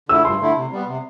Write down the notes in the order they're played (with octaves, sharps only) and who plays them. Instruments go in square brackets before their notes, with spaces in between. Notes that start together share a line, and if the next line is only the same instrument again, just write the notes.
[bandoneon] D3 A3 E4 [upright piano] E6
[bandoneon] G2 [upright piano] C6
[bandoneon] D3 A3 E4
C3
G3 B3
C3